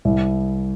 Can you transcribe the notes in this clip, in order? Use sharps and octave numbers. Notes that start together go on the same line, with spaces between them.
C2